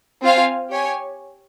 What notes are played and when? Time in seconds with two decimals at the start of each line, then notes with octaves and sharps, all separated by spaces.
0.23 C4 F4 C5 F5 G#5
0.71 G4 C#5 G#5